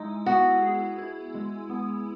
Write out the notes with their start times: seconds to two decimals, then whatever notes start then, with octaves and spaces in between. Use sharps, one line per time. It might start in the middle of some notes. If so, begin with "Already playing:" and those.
Already playing: G#3 D#4 E4
0.26 B3 F#4
0.62 G#4
0.98 E4
1.34 G#3
1.70 B3